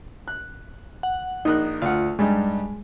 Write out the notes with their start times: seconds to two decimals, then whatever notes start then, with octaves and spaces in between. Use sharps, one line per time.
0.28 F#6
1.03 F#5
1.45 A#1 D#4 A#4 F#6
1.82 D2 F4 F#5
2.19 G2 G3 G#3 D#4